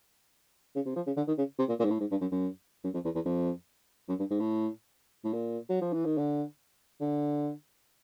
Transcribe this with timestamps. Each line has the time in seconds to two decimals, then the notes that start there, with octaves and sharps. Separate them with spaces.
0.75 C#3
0.86 C3
0.96 F3
1.06 C#3
1.17 D3
1.27 D#3
1.38 C#3
1.59 C3
1.68 A#2
1.79 A#2
1.84 G#2
1.90 A2
2.00 G#2
2.11 G2
2.21 F#2
2.31 F#2
2.84 F#2
2.94 F2
3.04 E2
3.15 E2
3.25 F2
4.09 F#2
4.19 G2
4.30 G#2
4.40 A2
5.24 A2
5.33 A#2
5.69 F#3
5.81 F3
5.93 E3
6.05 D#3
6.17 D3
7.00 D3